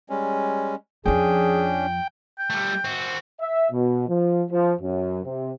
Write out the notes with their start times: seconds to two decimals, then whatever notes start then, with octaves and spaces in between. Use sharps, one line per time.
0.10 G3 G#3 C#4
1.06 F2 F3 C#4 D4 G#4 G5
2.38 G5
2.50 G3 A3
2.84 C4 F#4
3.41 E5
3.71 B2
4.08 F3
4.50 F3
4.80 F#2
5.24 C3